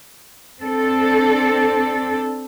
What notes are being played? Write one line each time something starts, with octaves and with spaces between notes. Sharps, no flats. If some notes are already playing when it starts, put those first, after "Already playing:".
C4 D4 A4